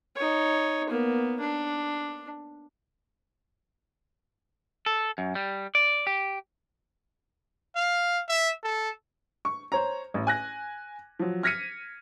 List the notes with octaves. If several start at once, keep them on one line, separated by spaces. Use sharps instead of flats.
D#4 C#5
A#3 B3
D4
A4
F#2
G3
D5
G4
F5
E5
A4
C#6
C5 C#5 A#5
A1
G#5 F#6 A#6
F3 F#3
F6 G#6 A#6 B6 C#7 D#7